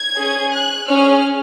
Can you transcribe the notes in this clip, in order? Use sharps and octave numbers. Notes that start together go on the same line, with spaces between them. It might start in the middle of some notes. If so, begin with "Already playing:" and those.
Already playing: G#6
C#4 G#4
F#6
C#4 G#4 F6